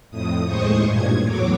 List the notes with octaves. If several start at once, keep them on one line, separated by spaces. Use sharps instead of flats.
F2 A2 D#6
D#2 A2 G#3 C5 C#6 D#6
G2 A#2 G#6
E2 A2 F#3 C#5 D6